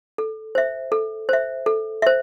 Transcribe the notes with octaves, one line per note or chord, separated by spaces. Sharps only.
A4
C5 E5
A4
C5 E5
A4
C5 E5